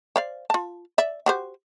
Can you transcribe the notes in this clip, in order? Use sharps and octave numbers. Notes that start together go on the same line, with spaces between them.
C5 D5 F5
F4 A5
D5 E5
F#4 G4 C5